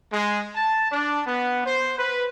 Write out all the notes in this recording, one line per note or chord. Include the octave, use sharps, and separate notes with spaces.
G#3
A5
D4
B3
C5
B4